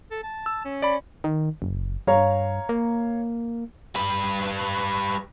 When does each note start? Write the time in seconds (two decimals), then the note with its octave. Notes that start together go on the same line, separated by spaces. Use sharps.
0.11 A4
0.23 A5
0.46 E6
0.65 C#4
0.82 D5 B5
1.24 D#3
1.62 F#1
2.07 G2 C#5 F5 A#5
2.69 A#3
3.95 G3 B4